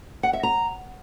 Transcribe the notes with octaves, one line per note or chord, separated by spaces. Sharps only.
F#5
E5
A#5